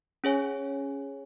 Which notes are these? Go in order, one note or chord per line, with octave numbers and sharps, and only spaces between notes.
C#4 G#4 C#5 G#5